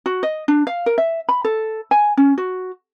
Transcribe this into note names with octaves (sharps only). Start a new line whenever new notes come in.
F#4
D#5
D4
F5
A#4
E5
B5
A4
G#5
C#4
F#4